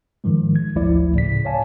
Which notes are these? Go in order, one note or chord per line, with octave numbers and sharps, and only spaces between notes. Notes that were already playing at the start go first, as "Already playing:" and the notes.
G#2 D#3 F3 G#3
G#6
G#1 D2 F3 A3 E4 D5
A2 C#3 B6
C#5 D5 F5 G#5 A5